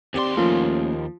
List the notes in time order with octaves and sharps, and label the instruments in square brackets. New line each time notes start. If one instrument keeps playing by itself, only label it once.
[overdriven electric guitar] D#2 C6 [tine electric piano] C4 G4 D5
[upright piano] F3 [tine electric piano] A3 A#3 C#4